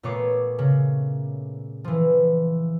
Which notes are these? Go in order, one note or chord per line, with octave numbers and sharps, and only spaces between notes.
A#2 A3 B3 C#5 D6 C7
C#3
E3 F3